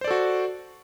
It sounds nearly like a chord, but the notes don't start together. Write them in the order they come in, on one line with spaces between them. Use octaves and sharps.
C5 D5 A4 F#4